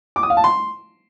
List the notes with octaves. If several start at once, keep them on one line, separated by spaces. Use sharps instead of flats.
D6
D#6
F5
A5
C6